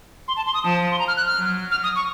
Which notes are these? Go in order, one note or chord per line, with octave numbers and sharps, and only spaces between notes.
C6
A5
C6
D#6
F3 A5
C6
A#5
F6
F#6
F6
F#3
F6
D#6
C#6